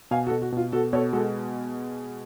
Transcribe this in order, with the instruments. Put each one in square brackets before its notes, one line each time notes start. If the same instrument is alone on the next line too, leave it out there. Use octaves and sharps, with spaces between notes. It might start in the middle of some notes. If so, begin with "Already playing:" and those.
[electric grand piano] B2 [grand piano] F5 G#5
[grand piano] F#4 A4
[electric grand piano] B2
[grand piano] F#4
[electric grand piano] B2 [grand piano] F4
[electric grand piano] B2 [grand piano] F#4 A4
[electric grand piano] B2 [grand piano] A4 C#5
[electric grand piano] G#3 [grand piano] F#4 A4